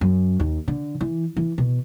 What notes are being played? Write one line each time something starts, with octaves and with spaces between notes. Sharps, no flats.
F#2
D#2
D3
E3
E3
B2